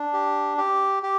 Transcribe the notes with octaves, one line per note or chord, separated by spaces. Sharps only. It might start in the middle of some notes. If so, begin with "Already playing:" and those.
Already playing: D4
G4
G4
G4